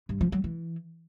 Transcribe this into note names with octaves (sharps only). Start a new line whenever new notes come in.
G2
F3
F#3
E3